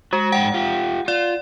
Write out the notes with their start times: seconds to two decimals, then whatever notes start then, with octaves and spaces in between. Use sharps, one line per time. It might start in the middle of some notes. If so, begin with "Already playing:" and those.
0.13 G#3 F#4
0.32 G#2 D5 F#5 G5
0.54 F4 G4
1.08 F4 D5